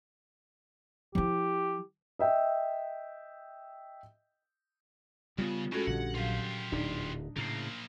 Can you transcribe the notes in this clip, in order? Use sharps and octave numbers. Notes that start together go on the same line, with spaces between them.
F3 E4 G4
D#5 E5 G5
C#3 G3 A3 B3 F4
A2 G#3 C#4 F#4 A4 G#6 A#6
A#1 G2 D3 F#5
A#2 F#3 F4 G4 F5
D1 D4 D#4
A2 C#3 A#3 C5